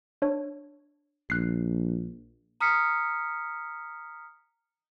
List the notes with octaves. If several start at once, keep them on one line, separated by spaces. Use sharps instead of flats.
D4 C#5
A#1 F#6 C7
A#5 D#6 F6 B6 C#7